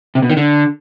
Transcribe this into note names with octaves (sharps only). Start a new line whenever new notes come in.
C3
B2
D#3
D3